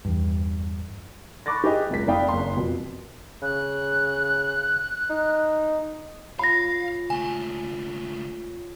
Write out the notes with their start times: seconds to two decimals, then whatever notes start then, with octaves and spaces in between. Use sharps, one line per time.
0.05 E2 G2
1.46 B5 C#6 D6 F#6 A6 A#6
1.64 G4 G#4 D#5
1.90 F#1 C#2 B6
2.07 F1 D5 F5 G5 B5 D#6
2.29 F#1 C6
2.57 F2 B2
3.42 C#3 F#6
5.10 D#4
6.39 F4 C#5 F5 B5 A#6
7.10 C#2 A3 G#5